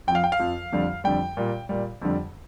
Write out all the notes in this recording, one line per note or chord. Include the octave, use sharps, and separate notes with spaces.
F2 F3 F5 G5
G5
F5
F2 F3
F2 D3 G3
F2 D3 G3 G5
A#2 G3
A#2 G3
F2 D3 G3